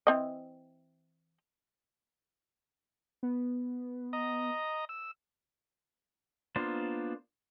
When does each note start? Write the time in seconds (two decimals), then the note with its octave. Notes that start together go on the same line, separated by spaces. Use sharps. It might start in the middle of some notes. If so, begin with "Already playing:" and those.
0.07 E3 C4 D#5
3.23 B3
4.13 D#5 A#5
4.89 E6
6.56 A#3 B3 D4 F4 C5